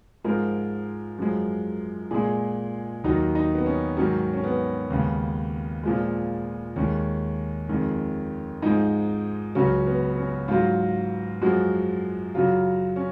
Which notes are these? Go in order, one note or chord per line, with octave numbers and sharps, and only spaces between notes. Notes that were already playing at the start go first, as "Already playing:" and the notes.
G#2 F3 G#3 A#4
F#2 F3 G#3
A#2 G#3 G#4
D#2 D#3 F#3 D#4
D#4
B3
C#4
G#2 D#3 F#3 C#4
C#4
B3
D#2 C#3 G#3
A#2 F3 G#3
D#2 D#3 G#3 C#4
F2 D#3 G#3
G#2 F3 G#3 D#4
C#2 C#3 F#3 C#4
B3
C#4
G#2 F#3 F4
F#2 F3 G#3 F#4
F#2 C#3 F#3 F4
C#4